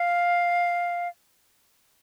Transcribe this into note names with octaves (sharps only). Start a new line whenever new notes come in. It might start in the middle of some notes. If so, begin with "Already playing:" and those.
Already playing: F5